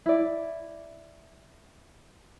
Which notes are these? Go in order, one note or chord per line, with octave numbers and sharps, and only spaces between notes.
E4 D5